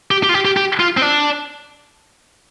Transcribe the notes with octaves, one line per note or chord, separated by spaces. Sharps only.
G4
G4
F4
G4
G4
G4
F4
C4
D4